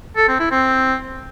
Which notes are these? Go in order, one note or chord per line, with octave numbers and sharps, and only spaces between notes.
A4
C4
E4
C4